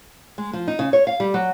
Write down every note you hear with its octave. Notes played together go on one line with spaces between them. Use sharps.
G#3
F3
D#4
C#3
C#5
F5
G3
F#3